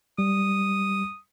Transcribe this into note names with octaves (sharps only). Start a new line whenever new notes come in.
G3 D#6